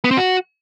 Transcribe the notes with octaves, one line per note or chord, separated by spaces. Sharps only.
B3
C4
F#4